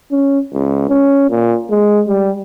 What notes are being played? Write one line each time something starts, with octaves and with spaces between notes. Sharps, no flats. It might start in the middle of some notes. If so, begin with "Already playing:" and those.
C#4
C#2
C#4
A#2
G#3
G3